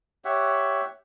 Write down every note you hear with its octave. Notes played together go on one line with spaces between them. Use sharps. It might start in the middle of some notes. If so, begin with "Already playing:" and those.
G4 C#5 E5 F#5